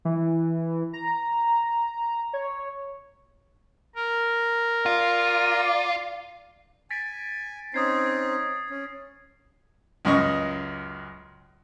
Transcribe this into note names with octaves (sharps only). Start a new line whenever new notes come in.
E3
A#5
C#5
A#4
F4 D5
G#5 A6 B6 D7
C4 C#4 D#4 D#6 G#6 C7
C#4
C#2 F#2 D#5 C#6